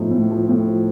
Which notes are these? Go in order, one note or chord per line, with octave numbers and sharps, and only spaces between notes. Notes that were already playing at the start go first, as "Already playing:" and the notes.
Already playing: A2 F3 D#4
A2
F3
A2
F3